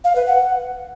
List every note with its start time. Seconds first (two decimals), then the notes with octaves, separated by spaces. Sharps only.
0.04 F5
0.16 B4
0.27 F#5